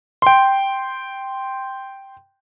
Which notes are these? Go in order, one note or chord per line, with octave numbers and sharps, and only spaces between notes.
G5 C6